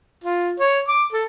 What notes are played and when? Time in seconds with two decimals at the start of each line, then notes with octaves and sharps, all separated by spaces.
0.24 F4
0.60 C#5
0.88 D6
1.13 A4